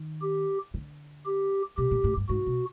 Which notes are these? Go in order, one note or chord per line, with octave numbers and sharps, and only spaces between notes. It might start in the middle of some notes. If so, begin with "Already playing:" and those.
Already playing: D#3
G4
D3
G4
B2 G4
A#2
A2
G2
G#2 F#4
B2